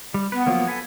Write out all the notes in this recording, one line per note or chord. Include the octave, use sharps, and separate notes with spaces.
G3
B3 B4
F3 F#3 A#3
A4 B4 G#5